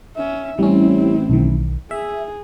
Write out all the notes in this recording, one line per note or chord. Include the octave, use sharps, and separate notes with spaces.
C#4 E5
A1 G3 C4 C#4 E4
B1 D#3
G#4 E5